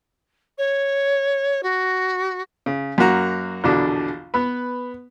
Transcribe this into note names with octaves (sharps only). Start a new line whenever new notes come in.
C#5
F#4
C#3
F#2 A#3 F#4 A#5
A#1 E2 B2 D3 D4
B3 B4